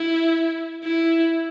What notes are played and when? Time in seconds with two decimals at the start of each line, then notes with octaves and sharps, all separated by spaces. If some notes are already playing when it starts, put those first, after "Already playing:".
Already playing: E4
0.83 E4